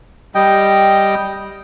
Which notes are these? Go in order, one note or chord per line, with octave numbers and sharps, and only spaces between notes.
G3 D#5 G5